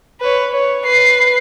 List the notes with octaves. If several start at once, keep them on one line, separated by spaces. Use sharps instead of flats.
B4 C#5
C#5
B4 C7